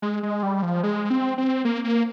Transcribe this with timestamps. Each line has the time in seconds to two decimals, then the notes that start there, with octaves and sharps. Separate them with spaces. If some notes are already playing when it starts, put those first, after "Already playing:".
0.02 G#3
0.23 G#3
0.43 G3
0.62 F3
0.83 G#3
1.10 C4
1.38 C4
1.65 A#3
1.84 A#3